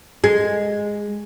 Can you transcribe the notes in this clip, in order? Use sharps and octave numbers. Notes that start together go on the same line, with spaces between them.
G#3